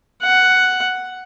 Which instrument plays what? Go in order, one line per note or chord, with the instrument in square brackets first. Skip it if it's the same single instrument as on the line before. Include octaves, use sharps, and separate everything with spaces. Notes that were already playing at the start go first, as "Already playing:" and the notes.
[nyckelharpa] F#5